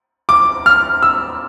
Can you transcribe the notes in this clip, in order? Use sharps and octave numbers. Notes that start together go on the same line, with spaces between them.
D6
F6
E6